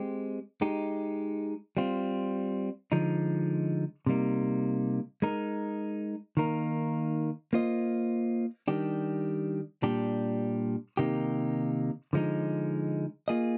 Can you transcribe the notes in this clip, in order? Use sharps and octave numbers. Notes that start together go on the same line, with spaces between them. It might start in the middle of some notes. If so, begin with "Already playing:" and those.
Already playing: G#3 C4 G4
G#3 D#4 G4
G3 C4 F4
D3 F3 G#3 D#4
C3 G3 A#3 D#4
G#3 D#4 A#4
D#3 A#3 D#4 A#4
A#3 F4 C5 D#5
D#3 G3 D4 G4
A#2 G3 D4 G4
C3 D#3 A#3 D#4 G4
D3 F3 G#3 D#4
A#3 F4 G#4 D#5